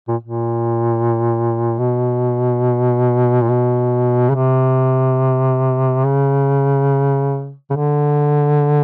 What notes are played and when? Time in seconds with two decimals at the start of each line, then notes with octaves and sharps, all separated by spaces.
0.08 A#2
0.23 A#2
1.79 B2
3.42 A#2
3.49 B2
4.29 C#3
4.35 C3
6.05 C#3
7.70 C#3
7.76 D3